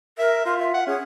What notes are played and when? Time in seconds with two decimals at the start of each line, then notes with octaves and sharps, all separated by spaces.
0.18 A#4 E5
0.46 F4 C6
0.59 E5
0.74 F#5
0.87 C#4 G#4